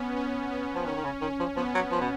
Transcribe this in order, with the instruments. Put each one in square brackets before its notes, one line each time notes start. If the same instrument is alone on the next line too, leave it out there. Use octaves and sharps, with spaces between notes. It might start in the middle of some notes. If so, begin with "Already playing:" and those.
Already playing: [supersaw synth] B3 C#4
C#4
B3
[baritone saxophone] F3
[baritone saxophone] D#3 [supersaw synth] C#4
[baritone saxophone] D#3
C#3
[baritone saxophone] D#3 [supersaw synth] C#4
[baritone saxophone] F3
[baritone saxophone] F3 [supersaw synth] B3
[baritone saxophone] F#3
F3
B2